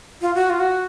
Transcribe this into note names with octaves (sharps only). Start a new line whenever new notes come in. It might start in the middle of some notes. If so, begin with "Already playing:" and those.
F4
F#4
F4
F#4